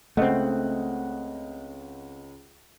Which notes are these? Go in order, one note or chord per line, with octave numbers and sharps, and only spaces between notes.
C#2 A3 C4 D#5 F#5